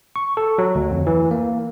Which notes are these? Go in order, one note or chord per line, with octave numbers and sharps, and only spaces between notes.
C#6
A4
F#3
D2
F2
E3
A#3